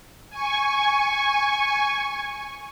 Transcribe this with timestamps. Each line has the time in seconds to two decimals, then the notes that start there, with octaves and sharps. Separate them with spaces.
0.30 G#5 C#6